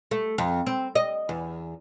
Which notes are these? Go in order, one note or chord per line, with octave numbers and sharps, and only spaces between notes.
A3
F2
C4
D#5
E2